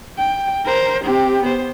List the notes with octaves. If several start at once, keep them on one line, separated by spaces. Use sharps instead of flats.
G5
A#4 C5
C4 G4
B3 C5